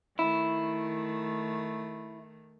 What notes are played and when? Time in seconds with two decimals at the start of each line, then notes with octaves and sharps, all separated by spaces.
0.19 D#3 A3 E4